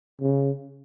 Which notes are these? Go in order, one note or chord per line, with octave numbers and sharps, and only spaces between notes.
C#3